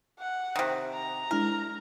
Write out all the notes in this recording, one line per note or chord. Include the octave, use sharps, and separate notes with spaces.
F#5
C3 D#3
A#5
G#3 D4 E4 A#4